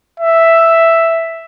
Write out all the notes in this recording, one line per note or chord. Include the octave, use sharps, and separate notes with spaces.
E5